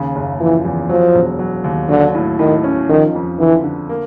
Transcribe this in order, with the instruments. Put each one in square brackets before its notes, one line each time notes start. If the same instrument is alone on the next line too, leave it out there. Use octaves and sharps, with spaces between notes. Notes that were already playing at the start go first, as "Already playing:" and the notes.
Already playing: [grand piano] D#2 C#3
F#1
[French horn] E3 [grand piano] F3
[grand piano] E2
[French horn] F3 [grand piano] F#3
[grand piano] E1
F#3
D#2
[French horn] D3 [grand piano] F#3
[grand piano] A2
[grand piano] A2 [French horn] D#3
[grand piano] C#4
[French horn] D#3 [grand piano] F3
[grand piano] F2
[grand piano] D3 [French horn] E3
[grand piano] D3
A#3